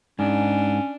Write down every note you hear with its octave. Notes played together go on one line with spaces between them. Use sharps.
G#2 C#4 D4